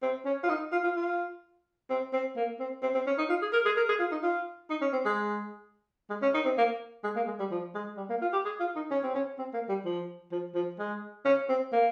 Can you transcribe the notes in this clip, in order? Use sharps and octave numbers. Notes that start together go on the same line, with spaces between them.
C4
C#4
F4
D#4
F4
F4
F4
C4
C4
A#3
C4
C4
C4
C#4
D#4
F4
G#4
A#4
G#4
A#4
G#4
F4
D#4
F4
D#4
C#4
C4
G#3
G#3
C#4
D#4
C4
A#3
G#3
A#3
G#3
G3
F3
G#3
G3
A#3
F4
G4
G#4
F4
D#4
C#4
C4
C#4
C4
A#3
G3
F3
F3
F3
G#3
C#4
C4
A#3